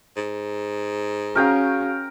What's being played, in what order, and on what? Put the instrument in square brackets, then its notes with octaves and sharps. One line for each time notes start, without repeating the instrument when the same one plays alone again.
[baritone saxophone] G#2
[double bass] C#4 [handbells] F#4 G#4 F5 [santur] A#4 G5 A#5